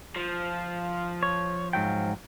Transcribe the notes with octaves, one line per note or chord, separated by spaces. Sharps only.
F3
C#5
G#2 F#3 G5